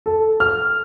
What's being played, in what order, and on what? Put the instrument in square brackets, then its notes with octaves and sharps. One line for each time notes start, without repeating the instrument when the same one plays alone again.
[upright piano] A4
F6